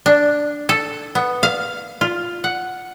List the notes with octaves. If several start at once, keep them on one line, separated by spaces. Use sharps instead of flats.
D4
A4
B3
F5
F4
F#5